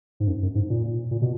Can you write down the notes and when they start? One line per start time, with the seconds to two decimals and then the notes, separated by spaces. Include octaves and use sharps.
0.20 G#2
0.27 F#2
0.42 F#2
0.55 G#2
0.70 A#2
1.11 A#2
1.22 B2